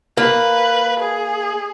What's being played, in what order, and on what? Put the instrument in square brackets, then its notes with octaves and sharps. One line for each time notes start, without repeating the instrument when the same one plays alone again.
[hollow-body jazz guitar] A#3 [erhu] B4
[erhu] G#4